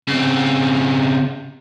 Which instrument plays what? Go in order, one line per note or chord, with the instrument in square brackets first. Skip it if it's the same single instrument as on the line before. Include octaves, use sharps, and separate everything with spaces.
[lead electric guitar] C#3 C4